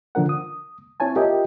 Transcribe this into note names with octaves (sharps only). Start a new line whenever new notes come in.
D3 F3 D4 A#4 F#5
D#6
C4 E4 C#5 G#5 A5
F4 G4 A#4 D#5 E5 G5